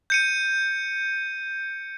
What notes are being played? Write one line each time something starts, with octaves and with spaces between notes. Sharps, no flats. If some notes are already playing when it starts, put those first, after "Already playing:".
G6 C#7 D#7